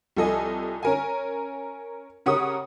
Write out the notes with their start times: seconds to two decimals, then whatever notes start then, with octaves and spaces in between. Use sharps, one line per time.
0.16 C2 F3 A4 D#5 G#5
0.83 C#4 A#4 G#5
2.26 C#3 G4 A#4 C#5 F#5 D#6